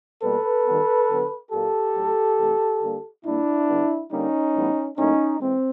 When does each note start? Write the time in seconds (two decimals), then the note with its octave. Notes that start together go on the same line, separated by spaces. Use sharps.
0.22 B2 G3 A#3 A4 B4
0.66 D#3 G3 B3
1.09 D3 F#3 B3
1.51 A#2 F#3 A#3 G4 A4
1.95 A2 F#3 A3
2.38 C3 E3 A3
2.82 D3 G3 A#3
3.24 A#2 G3 A#3 D4 E4
3.68 D3 G3 B3
4.11 D3 G3 A#3 C#4 D#4
4.54 A2 E3 G3 B3
4.97 A2 F#3 A#3 C#4 D#4
5.40 E3 G#3 C4